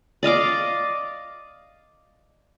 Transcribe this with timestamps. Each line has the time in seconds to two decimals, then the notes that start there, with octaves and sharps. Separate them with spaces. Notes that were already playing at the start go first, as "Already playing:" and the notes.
0.23 D5 D#5 F5 D6